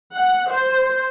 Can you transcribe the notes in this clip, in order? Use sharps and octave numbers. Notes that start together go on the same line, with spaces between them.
F#5
C5